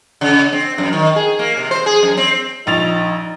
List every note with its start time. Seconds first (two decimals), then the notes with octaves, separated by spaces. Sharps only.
0.21 C#3
0.52 C4
0.78 F#2
0.93 D#3
1.16 G#4
1.39 A#3
1.57 C3
1.71 C5
1.86 G#4
2.03 F#2
2.17 C4
2.67 A#1 D#4 A6 F7